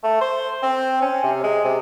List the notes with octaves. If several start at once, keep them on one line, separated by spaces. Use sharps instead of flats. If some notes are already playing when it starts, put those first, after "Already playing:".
A3
C5
C4
C#4
C3
G#3
C3